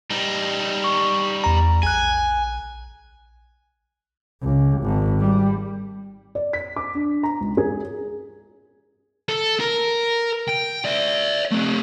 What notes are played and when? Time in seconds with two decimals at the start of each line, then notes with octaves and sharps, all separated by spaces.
0.10 G3 D#4
0.84 C#6
1.44 E2 A#5
1.83 A#1 G#5 F#6
4.43 C#2
4.83 G#1
5.20 G3
6.35 D5
6.53 B6
6.76 D6
6.95 D4
7.23 A#5
7.40 C#2
7.57 G#4
9.29 A4
9.60 A#4
10.49 G5
10.85 D5 E5
11.52 A3 C4